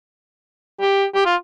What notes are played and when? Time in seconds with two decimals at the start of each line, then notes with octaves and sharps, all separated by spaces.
0.81 G4
1.15 G4
1.25 F4